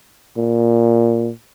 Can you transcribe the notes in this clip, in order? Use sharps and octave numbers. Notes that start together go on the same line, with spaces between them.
A#2